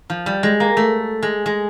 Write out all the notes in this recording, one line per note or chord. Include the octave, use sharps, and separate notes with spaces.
F3
G3
G#3
A#3
A3
G#3
G#3